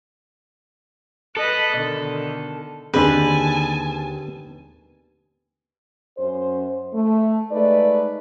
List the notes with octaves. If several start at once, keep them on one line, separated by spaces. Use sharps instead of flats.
A4 B4 D#5 F#6
B2 D3 D#3
D#2 D3 C4 D#4 G#4 B4 G#5 A5
F#2 C#4 C5
A3
G#3 A3 D#4 B4 D5